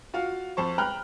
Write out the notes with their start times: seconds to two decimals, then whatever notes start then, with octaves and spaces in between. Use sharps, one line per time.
0.14 F4 F#4 F5
0.57 F2 C5 A5 C#6
0.78 G5 A#5 B5 F6 F#6